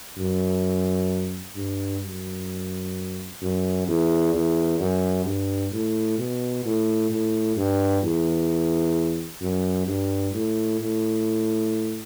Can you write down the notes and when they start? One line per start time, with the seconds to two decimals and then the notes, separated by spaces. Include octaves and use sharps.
0.19 F#2
1.56 G2
2.03 F#2
3.42 F#2
3.88 E2
4.33 E2
4.80 F#2
5.25 G2
5.73 A2
6.18 B2
6.65 A2
7.10 A2
7.57 G2
8.03 E2
9.42 F#2
9.87 G2
10.33 A2
10.80 A2